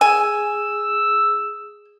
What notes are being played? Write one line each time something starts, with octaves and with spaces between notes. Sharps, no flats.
G#4 G#5 D#6 E6